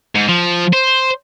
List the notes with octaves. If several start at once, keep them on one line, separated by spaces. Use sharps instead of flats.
G#2
F3
C5